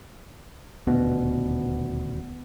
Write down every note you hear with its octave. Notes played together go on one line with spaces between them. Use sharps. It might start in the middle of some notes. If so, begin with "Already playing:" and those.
D#1 D2 B2 B3